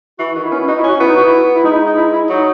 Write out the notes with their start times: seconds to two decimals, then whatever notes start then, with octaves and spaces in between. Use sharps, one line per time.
0.19 E3 F#4
0.35 D#3 F#4
0.43 E4
0.51 B3 C#4
0.59 E4
0.68 D#4 F#4
0.78 E4
0.84 C#4 F#4
1.00 B3 E4
1.08 D#4
1.16 F#4
1.24 E4
1.55 E4
1.64 G#3 D#4
1.71 E4
1.75 D#4
1.86 D#4
1.97 E4
2.13 E4
2.29 F#3 D#4